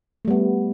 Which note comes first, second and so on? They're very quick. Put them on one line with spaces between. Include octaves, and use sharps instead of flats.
A3 G3 B3